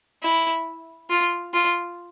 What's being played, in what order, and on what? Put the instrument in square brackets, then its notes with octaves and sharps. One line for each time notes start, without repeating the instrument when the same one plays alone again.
[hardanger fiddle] E4
F4
F4